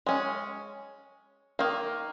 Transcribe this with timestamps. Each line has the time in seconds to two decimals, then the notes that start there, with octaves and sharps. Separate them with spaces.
0.06 G#3 C#4
1.59 D#3 A#3